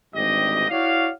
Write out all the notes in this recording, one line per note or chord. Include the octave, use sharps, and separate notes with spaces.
G#1 D2 G2 G4 D#5
E4 F#4 C#5 D5 F5